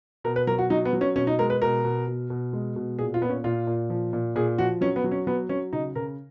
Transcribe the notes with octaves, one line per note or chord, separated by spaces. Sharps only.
B2 A#4
B4
F#3 A#4
F#4
F#3 D#4
B3
F#3
C#4
B2 C#4
D#4
G#3 A#4
B4
B2 A#4
B2
B2
B2
G#3
B2
A#2 G#4
F4
A#2 B3
C#4
A#2 F4
A#2
F3
A#2
A#2 G#4
F3 F#4
F#3 C#4
B3
F#3
C#4
F#3 B3
F#3 C#4
C#3 D#4
C#3 A#4